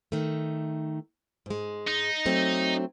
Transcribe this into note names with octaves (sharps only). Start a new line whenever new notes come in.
D#3 A3
G#2 G#3
D#4
F#3 A3 C4